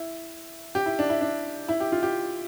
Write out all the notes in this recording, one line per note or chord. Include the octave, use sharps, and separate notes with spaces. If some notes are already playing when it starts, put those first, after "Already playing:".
Already playing: E4
G4
E4
D4
E4
D4
E4
G4
F4
G4